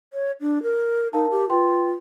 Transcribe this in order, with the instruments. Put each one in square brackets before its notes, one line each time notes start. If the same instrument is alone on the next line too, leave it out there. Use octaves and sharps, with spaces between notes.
[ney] C#5
D4
A#4
[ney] D#4 [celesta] A#4 F5 A5
[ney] G4
[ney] F4 [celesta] B4 G5 C6